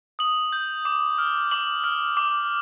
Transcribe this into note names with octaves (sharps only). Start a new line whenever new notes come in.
D#6 F#7
G6
D6
F6
D6 F#7
F6
D6